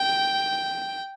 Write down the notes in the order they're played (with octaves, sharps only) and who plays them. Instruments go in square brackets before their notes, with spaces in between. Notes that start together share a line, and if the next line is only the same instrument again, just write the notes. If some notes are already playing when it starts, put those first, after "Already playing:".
Already playing: [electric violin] G5